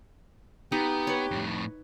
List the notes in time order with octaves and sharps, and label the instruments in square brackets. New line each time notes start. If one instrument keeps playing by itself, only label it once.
[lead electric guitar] B3 [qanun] D#4 [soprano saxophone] G4
[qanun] B4 C#5
[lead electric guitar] F2 A2